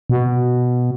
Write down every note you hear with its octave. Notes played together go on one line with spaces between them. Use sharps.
B2